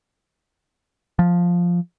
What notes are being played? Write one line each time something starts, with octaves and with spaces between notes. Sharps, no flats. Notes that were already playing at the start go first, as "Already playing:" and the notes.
F3